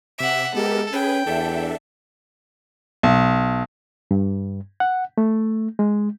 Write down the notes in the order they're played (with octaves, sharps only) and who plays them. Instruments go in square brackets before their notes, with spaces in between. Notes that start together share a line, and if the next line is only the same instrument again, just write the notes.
[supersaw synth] C3 D6 D7 [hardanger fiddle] E5 F#5
[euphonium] G#3 [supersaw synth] B3 G4 A#4 [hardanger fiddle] A4
[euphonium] C#4 [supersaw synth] G#4 B4 G#5 [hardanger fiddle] G5
[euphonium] E2 [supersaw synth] D4 A4 E5
[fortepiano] B1
[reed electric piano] G2
F#5
A3
G#3